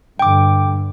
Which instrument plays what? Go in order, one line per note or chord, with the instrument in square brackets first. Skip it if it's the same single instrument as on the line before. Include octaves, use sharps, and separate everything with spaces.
[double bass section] G2 D3 [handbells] G5 D6